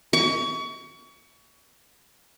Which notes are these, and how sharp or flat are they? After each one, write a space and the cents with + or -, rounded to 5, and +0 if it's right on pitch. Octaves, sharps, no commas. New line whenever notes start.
C#6 +30